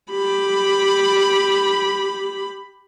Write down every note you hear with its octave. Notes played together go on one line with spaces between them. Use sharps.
G4 B5